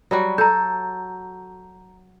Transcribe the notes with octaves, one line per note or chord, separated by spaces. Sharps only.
F#3 G3 F#4
A4 A#5 G6